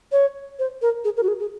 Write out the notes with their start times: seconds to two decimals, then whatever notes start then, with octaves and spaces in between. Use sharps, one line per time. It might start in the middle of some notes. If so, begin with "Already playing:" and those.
0.12 C#5
0.59 C5
0.82 A#4
1.05 G#4
1.17 A#4
1.23 F#4
1.28 G#4
1.40 G#4